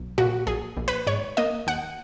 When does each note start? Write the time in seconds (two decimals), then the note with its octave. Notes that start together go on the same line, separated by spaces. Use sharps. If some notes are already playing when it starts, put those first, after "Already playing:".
Already playing: B1
0.18 A#2 F#4
0.47 A#1 G#4
0.77 A#1
0.88 B4
1.07 G#2 C#5
1.37 A#3 D#5
1.67 D#2 F#5